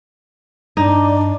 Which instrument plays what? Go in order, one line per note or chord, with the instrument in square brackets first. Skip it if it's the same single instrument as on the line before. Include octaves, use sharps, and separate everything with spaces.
[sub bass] G2 [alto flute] D4 [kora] D#4